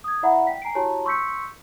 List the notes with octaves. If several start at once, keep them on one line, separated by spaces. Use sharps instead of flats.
D#6 G#6
E4 D5 E5 F#5 A#5 B5
G5 B6
G#5 A#5 C7 D7
E4 F#4 G4 C#5 A5 A#5
C6 C#6 E6 G6 B6 C#7